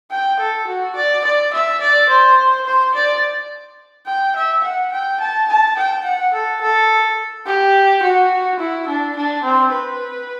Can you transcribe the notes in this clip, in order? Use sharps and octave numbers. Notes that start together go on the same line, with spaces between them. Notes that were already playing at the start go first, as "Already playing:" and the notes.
G5
A4
F#4
D5
D5
E5
D5
C5
C5
D5
G5
E5
F#5
G5
A5
A5
G5
F#5
A4
A4
G4
F#4
E4
D4
D4
C4
B4